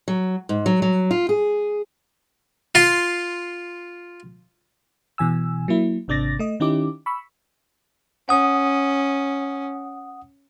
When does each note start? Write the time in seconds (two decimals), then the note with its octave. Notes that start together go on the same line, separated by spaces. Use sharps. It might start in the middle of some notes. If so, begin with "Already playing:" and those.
0.08 F#3
0.49 G#2
0.66 F#3
0.82 F#3
1.11 F4
1.29 G#4
2.75 F4 C6
5.18 B2 E3 G#5 E6
5.68 F#3 A#3 E4
6.08 G#1 C3 D4 D6 A6 A#6
6.39 A3 D#5
6.60 D#3 C#4 D#4 E4 G4 D6
7.06 B5 C#6 E6
8.29 C#4 F#5 D#6